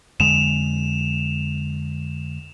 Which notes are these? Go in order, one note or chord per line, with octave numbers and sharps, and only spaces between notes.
F2 D3 G#3 E7 F7